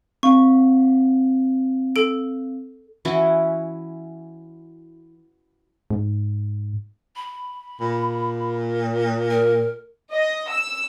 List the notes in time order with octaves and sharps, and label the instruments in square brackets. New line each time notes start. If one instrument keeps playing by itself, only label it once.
[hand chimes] C4 F5 [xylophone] C#6
[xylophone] A4 D7
[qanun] E3 C#4 E4 F#4
[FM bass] G#2
[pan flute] B5
[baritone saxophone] A#2
[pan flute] A#4
[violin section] D#5
E6